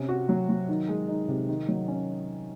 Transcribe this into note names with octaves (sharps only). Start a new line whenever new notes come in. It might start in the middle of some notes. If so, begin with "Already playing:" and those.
Already playing: C3 C#4
F#4
F#3
F#3
D#3
G#3
D#4
C3
D#3
F#3
C#4